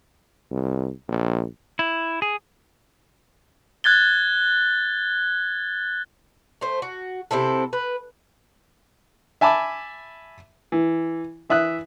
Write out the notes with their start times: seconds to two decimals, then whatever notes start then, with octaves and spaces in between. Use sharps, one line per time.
0.51 C2
1.08 A#1
1.79 E4
2.22 G#4
3.84 F#6 G#6 A6 G7
6.61 A3 C5
6.82 F#4
7.31 C3 C4 E4 A4
7.73 B4
9.41 E5 G#5 A5 B5 D6
10.72 E3
11.50 E3 E5 D#6 F#6